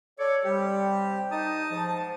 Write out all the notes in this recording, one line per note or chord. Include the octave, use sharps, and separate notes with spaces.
A4 C#5 D5
C3 G3 G4
D#4 A5 D#6
G#2 F3